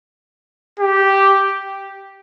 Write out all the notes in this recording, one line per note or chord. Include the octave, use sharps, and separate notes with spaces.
G4